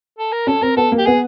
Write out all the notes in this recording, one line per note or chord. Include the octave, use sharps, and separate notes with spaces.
A4
A#4
C#4 A4
C4 A#4
B3 A4
A#3
G4
B3 G#4